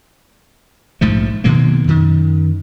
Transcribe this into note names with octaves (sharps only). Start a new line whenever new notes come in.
A#1 G#2 F3 A3
B2 D#3 F#3 A#3
F#2 D#3